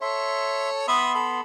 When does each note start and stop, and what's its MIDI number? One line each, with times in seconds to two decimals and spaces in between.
0.01 0.87 69
0.01 0.87 73
0.01 0.70 76
0.01 0.70 84
0.88 1.41 59
0.88 1.10 76
0.88 1.10 83
0.88 1.41 84
0.88 1.10 87
1.14 1.42 69
1.14 1.42 83